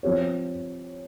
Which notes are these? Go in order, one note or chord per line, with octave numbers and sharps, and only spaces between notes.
F3 C4 G4 C#5